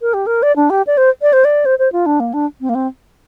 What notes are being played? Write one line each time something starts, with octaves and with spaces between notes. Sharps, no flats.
A#4
G4
A#4
D5
D4
G4
D5
C5
D5
C5
D5
C5
C5
F4
D4
A#3
D4
C4
A#3
C4